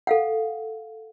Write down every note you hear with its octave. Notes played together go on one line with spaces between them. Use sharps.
A4 F5 F#5